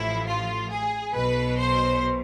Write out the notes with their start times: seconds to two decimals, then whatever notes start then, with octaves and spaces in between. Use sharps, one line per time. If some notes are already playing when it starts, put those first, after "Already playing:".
Already playing: A1 A2 F3 E4
0.27 F4
0.70 G#4
1.14 B1 B2 B4
1.58 C5